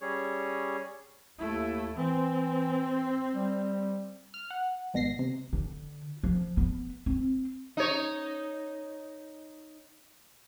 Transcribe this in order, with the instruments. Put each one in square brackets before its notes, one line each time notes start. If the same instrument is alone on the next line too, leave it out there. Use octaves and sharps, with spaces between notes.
[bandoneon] G3 C#4 G#4 C#5
[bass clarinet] D#2 [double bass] A3 E4
[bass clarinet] E3 [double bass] C4
[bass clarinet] G3
[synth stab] F6
F#5
G#1 B2 A#6 C7
C3
[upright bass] D3
F3
B3
C4
[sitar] D#4 C#5